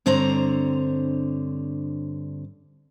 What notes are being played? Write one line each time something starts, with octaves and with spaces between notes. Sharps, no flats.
G2 D3 C4 C5 C#5 A#5